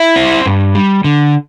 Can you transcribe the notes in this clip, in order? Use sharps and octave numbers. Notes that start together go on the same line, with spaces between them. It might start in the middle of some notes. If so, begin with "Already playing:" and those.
Already playing: E4 E5
C4
G2
G3
D3